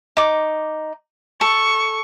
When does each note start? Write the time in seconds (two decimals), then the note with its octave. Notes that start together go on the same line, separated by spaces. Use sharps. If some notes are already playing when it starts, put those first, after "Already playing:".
0.17 D#4 D6
1.41 A4 C#6